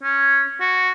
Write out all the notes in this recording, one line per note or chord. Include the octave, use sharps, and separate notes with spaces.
C#4
F#4